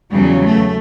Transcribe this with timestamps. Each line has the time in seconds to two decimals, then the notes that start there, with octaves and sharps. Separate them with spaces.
0.11 E2 C#3 F#3 G3
0.43 A3